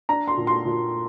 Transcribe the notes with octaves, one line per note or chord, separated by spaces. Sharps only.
D4 A#5
C6
A#2
C6
A#2